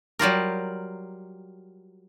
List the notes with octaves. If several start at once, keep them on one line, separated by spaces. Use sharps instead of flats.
F#3 G3 F4 A#4